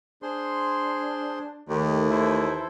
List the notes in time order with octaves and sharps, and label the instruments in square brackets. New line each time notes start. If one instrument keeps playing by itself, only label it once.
[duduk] D4 [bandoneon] G#4 C5 C6
[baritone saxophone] D#2 [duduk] D#3 [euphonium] A3 [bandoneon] G4
[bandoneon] E3 A4 C5 [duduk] E4